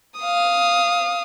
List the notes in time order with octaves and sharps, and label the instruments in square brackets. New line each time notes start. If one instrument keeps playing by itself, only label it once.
[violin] F5 D#6